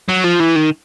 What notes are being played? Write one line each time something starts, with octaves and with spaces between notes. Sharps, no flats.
F#3
F3
E3
D#3